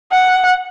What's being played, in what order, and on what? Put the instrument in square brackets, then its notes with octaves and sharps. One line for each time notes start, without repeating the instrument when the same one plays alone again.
[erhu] F#5